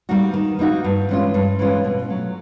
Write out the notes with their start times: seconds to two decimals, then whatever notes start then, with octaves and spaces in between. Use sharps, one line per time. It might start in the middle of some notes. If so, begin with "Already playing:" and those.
0.09 G3 A#3 D#4 F#4
0.34 D#3
0.59 G3 A#3 D#4 F#4
0.84 G2
1.09 E3 G#3 C#4 F4
1.34 G2
1.59 E3 G#3 C#4 F4
1.84 B2
2.09 F#3 A3